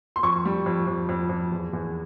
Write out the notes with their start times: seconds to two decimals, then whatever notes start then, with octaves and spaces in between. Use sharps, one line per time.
0.16 C6
0.23 F2 C#6
0.45 G3
0.66 F2
0.87 F2
1.09 F2
1.29 F2
1.52 E2
1.73 E2